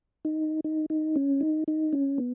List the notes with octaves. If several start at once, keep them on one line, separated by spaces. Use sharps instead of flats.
D#4
D#4
D#4
C#4
D#4
D#4
C#4
B3